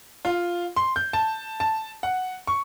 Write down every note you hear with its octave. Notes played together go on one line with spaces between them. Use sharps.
F4
C6
G6
A5
A5
F#5
C#6